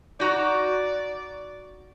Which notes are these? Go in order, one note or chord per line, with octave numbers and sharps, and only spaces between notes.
D#4 F#4 D5 A#5